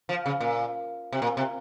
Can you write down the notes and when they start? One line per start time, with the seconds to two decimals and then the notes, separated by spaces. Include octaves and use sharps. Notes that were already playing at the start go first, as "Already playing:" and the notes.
0.09 F3
0.26 C#3
0.40 A#2
1.12 C3
1.22 A#2
1.37 C3